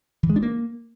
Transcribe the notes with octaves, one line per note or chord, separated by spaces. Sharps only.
E3
G#3
D4
A#3